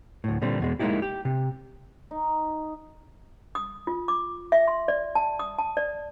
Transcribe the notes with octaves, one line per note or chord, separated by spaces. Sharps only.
D2 A2
A#2 D3 G3 C4
E2 B2 G#3
G#3 A#3 C#4 D#4 E4 G4
G4
C3
D#4
D#6
F4
D6
E5
C6
D5
A5
D#6
A5
D5